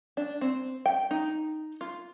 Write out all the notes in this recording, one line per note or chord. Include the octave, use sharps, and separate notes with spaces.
D4
C4
G5
D#4
F4